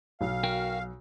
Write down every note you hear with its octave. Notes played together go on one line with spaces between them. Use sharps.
B1 F5
F#4 A#4 G5